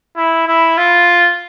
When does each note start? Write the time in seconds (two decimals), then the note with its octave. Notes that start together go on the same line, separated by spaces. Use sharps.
0.16 E4
0.47 E4
0.77 F4